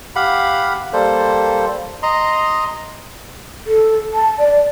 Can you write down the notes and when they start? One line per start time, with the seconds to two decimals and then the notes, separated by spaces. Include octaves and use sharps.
0.16 G4 F5 F#5 B5
0.93 G3 A#3 A4 C5
2.03 D#5 A#5 C6
3.66 A4
4.14 A5
4.39 D5